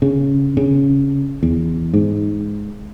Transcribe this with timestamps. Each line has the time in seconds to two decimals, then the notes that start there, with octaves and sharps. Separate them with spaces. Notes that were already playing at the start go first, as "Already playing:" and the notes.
0.02 C#3
0.57 C#3
1.43 E2
1.94 G#2